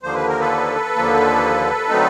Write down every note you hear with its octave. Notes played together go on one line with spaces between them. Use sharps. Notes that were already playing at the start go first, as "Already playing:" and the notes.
D#2 D3 F3 A#3 C5
B4
A#4
A4 B4
D#2 D3 F3 A#3
D3 F#3 A3 C4 D#4